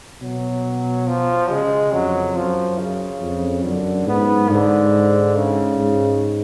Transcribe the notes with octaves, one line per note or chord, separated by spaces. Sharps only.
B2 F#3
F3
C#3 G#3
F2 F#3
F#2 F3
C#3
F2
F#2 D3
G#2 B3
G#2 D3
C#3
G#2